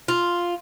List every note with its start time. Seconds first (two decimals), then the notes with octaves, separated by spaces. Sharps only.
0.08 F4